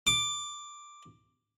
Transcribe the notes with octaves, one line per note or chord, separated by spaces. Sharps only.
D6